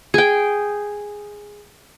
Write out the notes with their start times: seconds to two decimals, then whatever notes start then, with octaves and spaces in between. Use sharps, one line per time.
0.14 G#4 G5